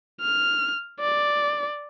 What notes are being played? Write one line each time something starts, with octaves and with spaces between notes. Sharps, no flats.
F6
D5